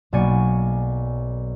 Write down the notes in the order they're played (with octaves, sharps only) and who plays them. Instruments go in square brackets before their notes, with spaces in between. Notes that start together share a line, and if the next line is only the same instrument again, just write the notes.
[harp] B1 B2 A#3 D5 G#5 C#7